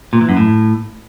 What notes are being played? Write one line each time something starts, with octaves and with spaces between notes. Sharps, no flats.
A#2
E3
F#2
A2